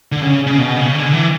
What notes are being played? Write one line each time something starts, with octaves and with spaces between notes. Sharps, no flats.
D3
C#3
C#3
B2
C#3
D3
E3